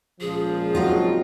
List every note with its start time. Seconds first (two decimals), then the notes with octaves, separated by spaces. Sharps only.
0.21 C#2 A#2 F3 G#4
0.75 F#3 C4 D#4 F4